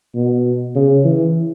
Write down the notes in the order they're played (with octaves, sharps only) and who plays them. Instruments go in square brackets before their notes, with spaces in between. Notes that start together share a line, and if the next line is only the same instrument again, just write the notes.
[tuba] B2
C#3
E3